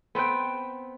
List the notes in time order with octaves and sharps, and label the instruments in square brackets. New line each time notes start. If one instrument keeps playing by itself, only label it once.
[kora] B3 C4 B4 G5